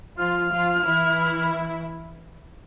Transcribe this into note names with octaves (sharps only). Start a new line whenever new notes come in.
F3 F4 F6
F3 F4
E3 E4